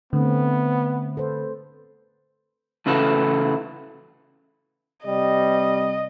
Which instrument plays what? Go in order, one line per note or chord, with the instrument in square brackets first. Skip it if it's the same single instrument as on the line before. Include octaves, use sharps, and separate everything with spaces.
[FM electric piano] D3 [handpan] A3 C4 [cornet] B3
[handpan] A4 B4 C5
[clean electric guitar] A2 C#3 E3 E4 F#4 A4
[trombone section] C3 G3 [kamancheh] D#5